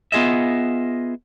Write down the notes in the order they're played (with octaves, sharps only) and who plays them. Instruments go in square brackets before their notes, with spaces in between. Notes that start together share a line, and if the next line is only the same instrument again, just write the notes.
[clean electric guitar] B3 F4 G#4 D#5 E5